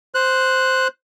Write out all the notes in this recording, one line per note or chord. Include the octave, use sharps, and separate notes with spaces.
C5 F#6